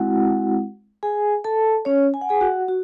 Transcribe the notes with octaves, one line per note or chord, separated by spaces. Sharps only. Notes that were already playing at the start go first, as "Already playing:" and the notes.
Already playing: G#3 C4 E4 F#4 F#5
G#4 G#5
A4 A5
C#4 C#5
G#5
F#5
G#4 G#5
F#4 F#5
F#4